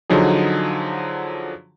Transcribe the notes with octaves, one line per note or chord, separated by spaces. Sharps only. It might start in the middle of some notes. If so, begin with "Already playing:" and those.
D3 F3 F#3 D#4 G#4